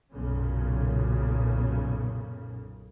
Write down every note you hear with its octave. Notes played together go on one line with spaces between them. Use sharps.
B1 F#2 A#2 C#3